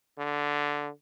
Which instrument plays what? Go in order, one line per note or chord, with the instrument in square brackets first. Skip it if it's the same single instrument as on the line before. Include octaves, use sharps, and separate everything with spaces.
[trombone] D3